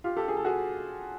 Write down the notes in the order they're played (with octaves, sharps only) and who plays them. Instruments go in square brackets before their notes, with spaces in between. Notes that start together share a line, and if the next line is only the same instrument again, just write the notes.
[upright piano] F4 G4
G4 A4
G#4
A4
F#4 G#4